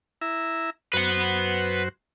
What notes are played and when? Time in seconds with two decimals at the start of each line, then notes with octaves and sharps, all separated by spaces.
0.21 E4 E5 A#5
0.94 F#2 F#4 B4 C5 F#5